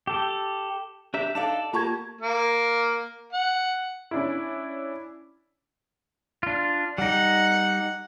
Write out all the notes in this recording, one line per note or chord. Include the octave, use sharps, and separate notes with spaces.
G4 A4
D4 G4 E5 A#5
D4 D#4 A4 D5 F5 A5
A#3 F4 G4 A5 A#5 C#6 G#6
A#3
F#5
C#4 D4 E4
D4 F4
G3 D#4 F#5